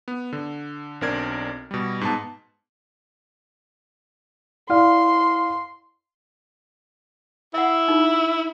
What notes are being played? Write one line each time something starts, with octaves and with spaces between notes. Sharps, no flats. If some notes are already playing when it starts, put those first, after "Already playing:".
B3
D3
B1 C4 D4 A#4 D5 G#6
B2 G3
G#2 B3 A5
E4 D5 F5 C6
E4 E5 F#5
D#4 F4